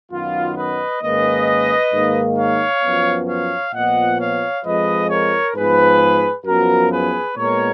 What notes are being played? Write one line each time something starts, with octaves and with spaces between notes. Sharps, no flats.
F#2 D#3 F#3 B3 F4
B4 D#5
G#2 D#3 A#3 C#4 B4 D#5
G#2 D#3 A#3
C#5 F5
F#2 F3 B3
C#5 F5
A#2 F3 B3 D#5 F#5
C#5 F5
F2 F3 G#3 B4 D#5
A#4 C#5
G#2 F3 B3 G#4 B4
F#2 F3 B3 F#4 A#4
G#4 B4
A#2 G#3 B3 A#4 C#5